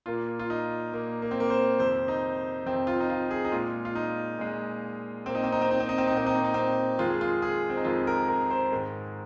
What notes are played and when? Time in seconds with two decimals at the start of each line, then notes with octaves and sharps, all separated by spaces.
0.06 A#2 A#3 F4
0.39 F4
0.50 D#4
0.93 A#2 A#3
1.22 A#3
1.31 C4
1.40 A#3
1.50 C5
1.79 F2 C3 D#3 C5
2.08 D#4
2.66 F2 C3 D#3 C4
2.87 F4
3.00 D#4
3.10 F4
3.31 G#4
3.45 D#4
3.52 A#2 G#3 F4
3.85 F4
3.95 D#4
4.38 A#2 G#3
5.25 A#2 A#3 C4
5.35 D#4
5.44 C4
5.52 D#4
5.61 C4
5.71 D#4
5.80 C4
5.89 D#4
5.98 C4
6.07 D#4
6.12 A#2 A#3 C4
6.26 D#4
6.35 C4
6.44 D#4
6.54 C4
6.98 F2 D#3 G#3 F4
7.10 G#4
7.21 F4
7.42 G#4
7.70 C4
7.77 D#4
7.85 F2 D#3 G#3 F4
8.07 A#4
8.28 A#4
8.51 C5
8.72 G#2 D#3 G#3